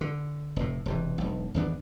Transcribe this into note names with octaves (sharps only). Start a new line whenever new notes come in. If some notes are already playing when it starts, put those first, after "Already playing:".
D3
F1 A2
E1 C3 E3
E1 B1
G#1 E2 B3 D4